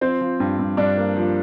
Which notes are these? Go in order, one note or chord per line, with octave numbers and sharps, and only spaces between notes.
F3 C4 C5
F3
G2
G2
G2 D4 D5
A#3
F3